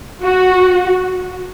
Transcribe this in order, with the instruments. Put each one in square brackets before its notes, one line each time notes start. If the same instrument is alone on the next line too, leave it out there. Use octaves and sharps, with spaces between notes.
[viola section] F#4